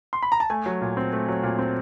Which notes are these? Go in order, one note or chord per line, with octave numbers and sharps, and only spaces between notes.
C6
B5
A#5
A5
A3 G#5
F#3
A#2
C4
A3
F#3
A#2
C4